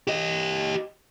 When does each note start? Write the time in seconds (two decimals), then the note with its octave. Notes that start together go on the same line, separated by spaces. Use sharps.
0.07 G4 D#5